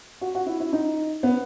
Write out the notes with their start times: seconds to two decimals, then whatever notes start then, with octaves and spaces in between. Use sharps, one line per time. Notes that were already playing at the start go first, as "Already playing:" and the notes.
0.21 F#4
0.35 F#4
0.46 E4
0.60 E4
0.73 D#4
1.23 B3